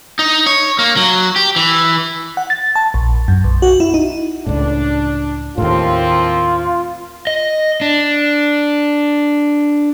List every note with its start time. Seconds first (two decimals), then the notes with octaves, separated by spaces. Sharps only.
0.19 D#4
0.46 C#5
0.79 A#3
0.97 F#3
1.36 G4
1.56 E3
2.37 F#5
2.50 A6
2.76 A5
2.94 A#1
3.28 F#2
3.44 B1
3.62 F#4
3.80 E4
3.94 D#4
4.46 C#2 A2 D4
5.58 D#2 A2 F3 A#3 C4 F4
7.27 D#5
7.81 D4